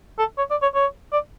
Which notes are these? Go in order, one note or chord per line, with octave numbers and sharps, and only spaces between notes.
A4
C#5
D5
C#5
C#5
D5